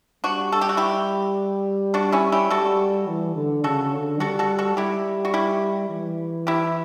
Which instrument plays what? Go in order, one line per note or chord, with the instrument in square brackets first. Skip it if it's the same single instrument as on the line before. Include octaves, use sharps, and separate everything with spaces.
[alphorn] G3 [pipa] D4 F#4
[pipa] A4
G4
F#4
E4 G4
D4 F#4
C#4 E4
E4 G4
[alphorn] G3 [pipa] F#4 A4
[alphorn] E3
D3
[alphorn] C#3 [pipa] F#4 A4
[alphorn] D3
[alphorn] G3 [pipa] F#4 A4
[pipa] F#4 A4
F#4 A4
[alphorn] G3 [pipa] E4 G4
[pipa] F#4
E4 G4
[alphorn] E3
[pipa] E4 G4